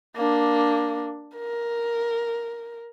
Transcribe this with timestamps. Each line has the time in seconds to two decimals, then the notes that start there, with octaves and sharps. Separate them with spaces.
0.16 A#3 D4
1.36 A#4